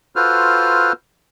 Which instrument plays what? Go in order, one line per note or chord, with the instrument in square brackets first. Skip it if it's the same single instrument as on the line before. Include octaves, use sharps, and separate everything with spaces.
[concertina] F4 F#4 A4 B4 C5 F6